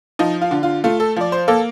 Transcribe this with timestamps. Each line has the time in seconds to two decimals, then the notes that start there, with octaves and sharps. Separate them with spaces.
0.19 F3 D#4
0.41 F4
0.51 D3
0.63 F4
0.84 A3 F4
1.00 A4
1.16 F3 D5
1.32 C5
1.48 A#3 A4